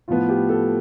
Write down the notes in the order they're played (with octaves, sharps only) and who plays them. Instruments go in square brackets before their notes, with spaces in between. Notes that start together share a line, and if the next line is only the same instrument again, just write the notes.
[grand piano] A2 F3 B3 F4
G4
A4